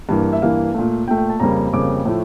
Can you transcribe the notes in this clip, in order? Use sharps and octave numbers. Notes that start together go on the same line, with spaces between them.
G2 E3 A#3
E5
G2 E3 A#3 F5
A#2 A3
A#2 A3 G5
G5
A5
F2 C#3 G3 A#3 A#5
F2 C#3 G3 A#3 D6
A2 F3 A3